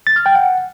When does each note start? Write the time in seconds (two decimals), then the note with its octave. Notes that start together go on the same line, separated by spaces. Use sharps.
0.07 A6
0.16 F6
0.26 G5
0.35 F#5